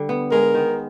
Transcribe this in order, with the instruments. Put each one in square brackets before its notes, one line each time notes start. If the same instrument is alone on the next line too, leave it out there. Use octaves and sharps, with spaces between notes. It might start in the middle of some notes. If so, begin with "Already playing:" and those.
Already playing: [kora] D3 G3 D4
B3
[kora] G#3 [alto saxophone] A#4
[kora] D#3